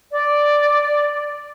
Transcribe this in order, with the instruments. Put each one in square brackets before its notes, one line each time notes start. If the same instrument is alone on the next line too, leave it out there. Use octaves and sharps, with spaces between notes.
[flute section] D5